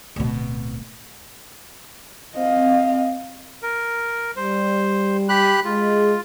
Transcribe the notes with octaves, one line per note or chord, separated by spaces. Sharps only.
D1 B2
C4 D#5 F5
A#4
G3 C5
G4 B5 F#6
G#3 F4